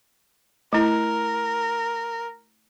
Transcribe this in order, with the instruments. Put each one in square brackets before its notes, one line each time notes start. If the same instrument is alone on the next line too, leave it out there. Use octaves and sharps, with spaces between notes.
[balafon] A3 E4 [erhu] A#4